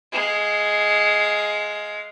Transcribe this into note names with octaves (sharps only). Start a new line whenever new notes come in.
G#3 F5